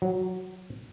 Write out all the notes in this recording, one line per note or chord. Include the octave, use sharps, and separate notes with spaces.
F#3